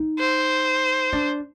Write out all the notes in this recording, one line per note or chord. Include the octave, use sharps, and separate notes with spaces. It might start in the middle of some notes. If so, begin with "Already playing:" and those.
Already playing: D#4
C5
D4